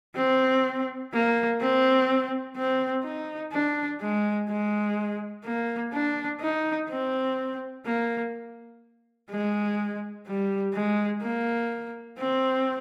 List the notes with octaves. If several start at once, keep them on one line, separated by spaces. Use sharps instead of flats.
C4
A#3
C4
C4
D#4
D4
G#3
G#3
A#3
D4
D#4
C4
A#3
G#3
G3
G#3
A#3
C4